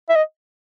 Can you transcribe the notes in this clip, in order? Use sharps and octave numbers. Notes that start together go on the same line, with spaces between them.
E5
D#5